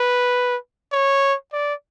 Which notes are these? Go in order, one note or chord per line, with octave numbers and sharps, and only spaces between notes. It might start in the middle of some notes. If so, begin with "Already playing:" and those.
Already playing: B4
C#5
D5